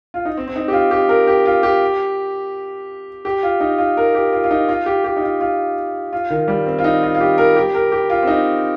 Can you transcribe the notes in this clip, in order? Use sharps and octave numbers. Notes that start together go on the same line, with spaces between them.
F4
D#4
C4
C4
D#4
G4
F4
G4
A#4
G4
F4
G4
G4
F4
D#4
F4
A#4
G4
F4
F4
D#4
F4
G4
G4
D#4
F4
F4
F4
D#3
G3
C4
F4
D#4
F4
F4
G4
A#4
G4
A#4
G4
F4
C4
D#4